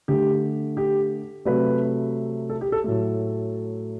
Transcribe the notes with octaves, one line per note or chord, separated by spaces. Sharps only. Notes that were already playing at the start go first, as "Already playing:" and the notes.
D3 A3 G4
G4
C3 F#3 A3 B4
A4
G4
A4
A2 F#3 A3